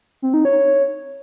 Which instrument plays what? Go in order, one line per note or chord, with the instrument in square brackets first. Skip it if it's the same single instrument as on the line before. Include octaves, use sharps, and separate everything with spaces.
[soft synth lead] C4
D#4
C#5